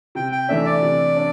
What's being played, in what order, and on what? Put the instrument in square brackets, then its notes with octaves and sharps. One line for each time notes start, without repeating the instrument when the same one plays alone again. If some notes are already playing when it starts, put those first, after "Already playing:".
[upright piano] C3 [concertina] G5
[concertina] G5
[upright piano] E3 A3 D4 [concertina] E5
[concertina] D5
[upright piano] C3
D4